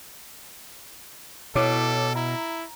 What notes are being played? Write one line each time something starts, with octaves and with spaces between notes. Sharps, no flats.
B2 E4 A4 C#5 D6
E4 A#5